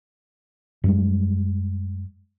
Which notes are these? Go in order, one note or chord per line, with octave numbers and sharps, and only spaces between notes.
F#2 G3 G#3